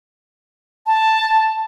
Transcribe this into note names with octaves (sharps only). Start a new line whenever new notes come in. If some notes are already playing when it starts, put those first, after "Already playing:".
A5